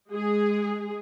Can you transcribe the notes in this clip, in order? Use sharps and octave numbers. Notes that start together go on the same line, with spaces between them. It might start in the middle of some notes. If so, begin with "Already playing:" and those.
G#3 G#4